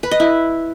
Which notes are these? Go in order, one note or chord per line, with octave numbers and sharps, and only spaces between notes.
B4
D#5
E4